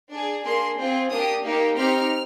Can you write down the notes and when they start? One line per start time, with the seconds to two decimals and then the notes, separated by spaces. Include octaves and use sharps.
0.12 D4 G#4
0.44 A#3 D4 G#4 C6
0.79 C4 F4 G#4
1.11 A#3 D4 G4 D#6
1.44 A#3 D#4 G4
1.77 C4 D#4 G4 F6